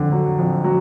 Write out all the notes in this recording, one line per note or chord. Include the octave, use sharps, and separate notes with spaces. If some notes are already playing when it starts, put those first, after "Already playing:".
Already playing: F2 D3
F#3
F2
F#3